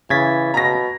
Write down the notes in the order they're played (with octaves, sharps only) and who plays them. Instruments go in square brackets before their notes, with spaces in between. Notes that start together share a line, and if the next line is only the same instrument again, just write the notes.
[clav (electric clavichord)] C#3 [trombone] E3 [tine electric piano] G#6 A6 B6
[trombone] B2 [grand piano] A#5 A#6